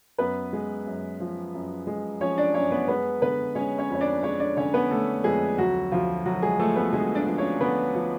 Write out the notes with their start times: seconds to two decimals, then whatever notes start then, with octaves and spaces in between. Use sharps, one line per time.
0.18 F#2 B3 B4
0.53 G#3
0.86 F#2
1.20 F3
1.54 F#2
1.87 G#3
2.21 F3 C#4 C#5
2.37 D4 D5
2.54 F#2 C#4 C#5
2.71 B3 B4
2.88 G#3 B3 B4
3.22 D3 B3 B4
3.55 G#3 C#4 C#5
3.78 C#4 C#5
3.90 F2 C#5
4.01 D4 D5
4.23 G#3 C#4 C#5
4.40 D4 D5
4.57 D3 C#4 C#5
4.74 B3 B4
4.90 D3 A3 A4
5.24 F2 G#3 G#4
5.58 D2 F#3 F#4
5.91 D2 F3 F4
6.25 D2 F#3 F#4
6.42 G#3 G#4
6.59 F3 A3 A4
6.76 B3 B4
6.93 D3 G#3 G#4
7.15 D4 D5
7.27 F3
7.38 C#4 C#5
7.60 D3 B3 B4
7.94 F3